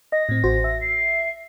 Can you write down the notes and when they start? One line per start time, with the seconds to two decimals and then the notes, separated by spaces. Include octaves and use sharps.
0.12 D#5 A#6
0.29 A2 C4
0.44 A1 F#4 C5
0.64 E5
0.81 C7